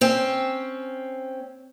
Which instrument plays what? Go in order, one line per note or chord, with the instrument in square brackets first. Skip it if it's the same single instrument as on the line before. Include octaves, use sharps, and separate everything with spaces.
[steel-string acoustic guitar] C4 C#4